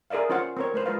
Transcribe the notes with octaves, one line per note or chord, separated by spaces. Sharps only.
G#4 A#4 D5 E5 F5
C#4 F4 C5 F5 F#5
C4 A#4 C#5
A3 B4 C5
G#3 F4 B4 F5